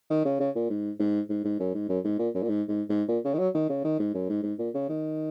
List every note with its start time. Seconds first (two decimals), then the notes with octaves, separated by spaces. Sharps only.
0.10 D#3
0.25 C#3
0.40 C#3
0.55 A#2
0.70 G#2
1.00 G#2
1.30 G#2
1.45 G#2
1.60 F#2
1.74 G#2
1.89 F#2
2.04 G#2
2.19 A#2
2.35 F#2
2.43 A#2
2.49 G#2
2.69 G#2
2.90 G#2
3.08 A#2
3.25 C#3
3.34 D#3
3.39 F#3
3.55 D#3
3.69 C#3
3.85 D#3
4.00 G#2
4.14 F#2
4.29 G#2
4.43 G#2
4.59 A#2
4.74 C#3
4.89 D#3